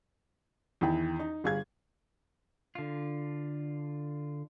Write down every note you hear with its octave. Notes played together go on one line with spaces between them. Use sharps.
E2 D#3 E4 G5
D#4
G1 G#4 F5 G#6
D3 F4